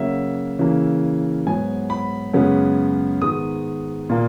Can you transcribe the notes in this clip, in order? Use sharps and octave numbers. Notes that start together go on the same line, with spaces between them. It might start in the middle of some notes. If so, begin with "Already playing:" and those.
Already playing: C#3 F#3 A#3 E5
C#3 E3 A#3
G#2 F#3 B3 G#5
B5
F#2 C#3 G#3 B3
G#2 D#3 G#3 B3 D#6
A#2 A#3